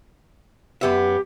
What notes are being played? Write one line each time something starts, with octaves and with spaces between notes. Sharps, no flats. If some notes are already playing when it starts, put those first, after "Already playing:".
F#2 B3 G4 E5